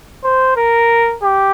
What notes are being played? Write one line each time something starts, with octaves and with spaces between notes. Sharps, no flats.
C5
A#4
G4